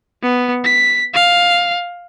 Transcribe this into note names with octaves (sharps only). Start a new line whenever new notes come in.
B3
B6
F5